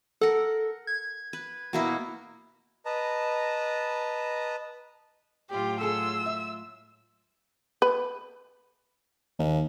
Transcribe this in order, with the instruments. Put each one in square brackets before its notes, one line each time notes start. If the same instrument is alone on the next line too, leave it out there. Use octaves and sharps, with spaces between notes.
[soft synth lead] A4 [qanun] A#4 F#5
[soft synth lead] G#6
[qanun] B4
B2 A#3 E4
[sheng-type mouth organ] B4 D#5 A5 A#5
[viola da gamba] A2 F#3 F4 [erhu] G4
[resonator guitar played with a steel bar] G#4 A4 [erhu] E6
[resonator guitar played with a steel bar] E5
[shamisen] B4
[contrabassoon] D#2